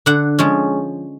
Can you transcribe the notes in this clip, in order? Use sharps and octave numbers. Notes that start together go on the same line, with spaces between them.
D3 F#5
F3 G#3 C#4